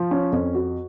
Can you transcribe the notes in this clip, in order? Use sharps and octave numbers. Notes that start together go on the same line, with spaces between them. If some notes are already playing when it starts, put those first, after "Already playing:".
Already playing: F3
C#4
F2
F#4